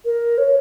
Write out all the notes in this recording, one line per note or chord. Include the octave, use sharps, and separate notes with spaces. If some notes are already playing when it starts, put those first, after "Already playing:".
A#4
C#5